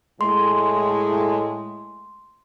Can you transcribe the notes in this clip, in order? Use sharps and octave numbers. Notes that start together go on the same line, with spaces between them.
A2 G#3 C6